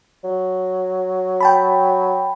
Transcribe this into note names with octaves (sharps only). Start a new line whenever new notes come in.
F#3
G5 A5 B5